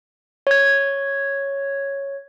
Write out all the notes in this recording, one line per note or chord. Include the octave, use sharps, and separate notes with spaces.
C#5 G#6